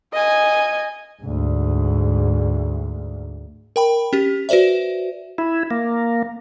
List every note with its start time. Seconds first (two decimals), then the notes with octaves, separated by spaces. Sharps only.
0.13 D#5 G#5
1.22 D2 G#2
3.76 A#4 G5 B5
4.13 C#4 G4
4.49 F#4 B4 C5 D5 E5
5.38 E4
5.71 A#3